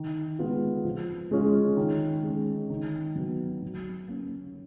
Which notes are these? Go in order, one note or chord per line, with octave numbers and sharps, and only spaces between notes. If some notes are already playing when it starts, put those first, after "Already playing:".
Already playing: D#3
G#3 B3 F4
F3
G#3 C#4 F4
D#3
G#3 C#4
D#3
F#3 B3
F#3
A#3 C#4